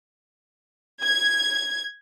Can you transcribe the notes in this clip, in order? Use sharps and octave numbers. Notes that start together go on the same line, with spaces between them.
G#6